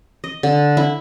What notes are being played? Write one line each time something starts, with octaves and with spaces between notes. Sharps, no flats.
D#5
D3
E4